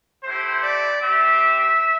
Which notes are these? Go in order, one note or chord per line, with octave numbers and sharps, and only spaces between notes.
A3 E4 G4 C5
D5
C4 G4 E5